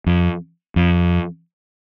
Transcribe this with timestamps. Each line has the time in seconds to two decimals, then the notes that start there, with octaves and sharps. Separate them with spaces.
0.06 F2
0.76 F2